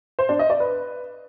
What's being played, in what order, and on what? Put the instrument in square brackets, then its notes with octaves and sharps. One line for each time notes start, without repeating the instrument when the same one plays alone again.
[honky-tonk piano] C5
D4
D#5
D5
B4